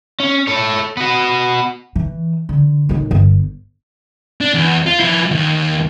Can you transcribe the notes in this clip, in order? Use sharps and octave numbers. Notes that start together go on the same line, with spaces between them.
C#4
A4 C#5
B3 F#4
E3
D3
A2 D#3
G1
D4
E2
F4
F3 E4
D#2